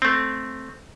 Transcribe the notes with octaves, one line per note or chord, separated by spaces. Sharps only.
A3 C4